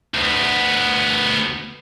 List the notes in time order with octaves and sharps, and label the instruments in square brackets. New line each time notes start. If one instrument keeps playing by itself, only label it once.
[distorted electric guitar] D2 B3